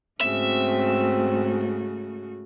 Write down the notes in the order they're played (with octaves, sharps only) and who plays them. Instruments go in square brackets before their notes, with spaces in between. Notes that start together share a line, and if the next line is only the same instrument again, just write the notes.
[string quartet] G#2 C#3 [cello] A3 F#4 [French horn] C4 [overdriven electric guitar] E5